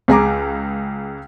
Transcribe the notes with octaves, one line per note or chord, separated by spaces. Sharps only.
C#2 G#4 A#5 D6